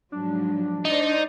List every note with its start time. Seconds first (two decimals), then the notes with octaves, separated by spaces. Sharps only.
0.12 G#2 F3 F#3 D4
0.85 D#4 C5 D5